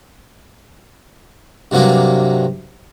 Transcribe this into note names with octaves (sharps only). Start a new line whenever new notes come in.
G2 C3 F#3 A#3 D4